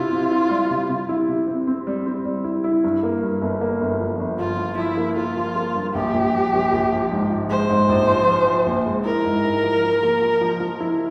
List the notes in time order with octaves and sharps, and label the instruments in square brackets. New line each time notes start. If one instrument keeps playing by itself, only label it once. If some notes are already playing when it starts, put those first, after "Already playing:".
Already playing: [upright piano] C3 E4 [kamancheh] F4
[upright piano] C3
E4
G3
C3
C3
E4
C3
C4
C4
G3
C4
G3
E4
E4
G2
A#3
G2
G1
A#3
G1
F3
G1
[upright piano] F3 [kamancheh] F4
[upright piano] F3
[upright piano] F3 [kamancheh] E4
[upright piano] A#3
[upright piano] A#3 [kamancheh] F4
[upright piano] F3
A#3
G2
[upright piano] A#1 [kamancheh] G4
[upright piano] A#1
F3
A#1
A#1
F3
G#2
F3
[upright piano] G#3 [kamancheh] C5
[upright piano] G#2
A#1
F3
F3
F3
A#1
G#3
[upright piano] E4 [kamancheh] A#4
[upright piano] G#2
E4
F3
F3
A#3
F3
F3
F3
E4